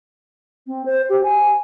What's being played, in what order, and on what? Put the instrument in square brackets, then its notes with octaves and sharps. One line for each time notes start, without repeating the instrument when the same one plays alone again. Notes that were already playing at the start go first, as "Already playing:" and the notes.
[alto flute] C4
C5
G4
G#5